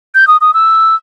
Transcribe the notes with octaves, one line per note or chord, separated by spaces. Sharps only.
G6
D#6
D#6
E6